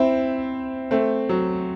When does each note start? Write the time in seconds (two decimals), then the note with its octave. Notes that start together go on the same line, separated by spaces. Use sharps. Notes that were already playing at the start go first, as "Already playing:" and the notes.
Already playing: C4 E4
0.91 A3 C4
1.29 F#3